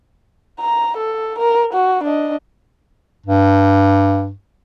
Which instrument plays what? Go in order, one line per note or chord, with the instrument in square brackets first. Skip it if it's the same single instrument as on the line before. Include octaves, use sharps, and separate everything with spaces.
[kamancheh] A#5
A4
A#4
F#4
D4 D#5
[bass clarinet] G2